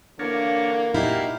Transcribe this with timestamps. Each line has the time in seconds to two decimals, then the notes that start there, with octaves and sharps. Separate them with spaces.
0.19 D3 E3 A#3 D4 A#4 C#5
0.94 A#2 D#4 E4 F#4 G4 F5